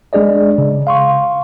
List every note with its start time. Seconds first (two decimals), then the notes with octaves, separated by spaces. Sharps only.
0.13 G#3 D4 G#4 D5 D#5
0.58 C#3
0.87 F5 C6 C#6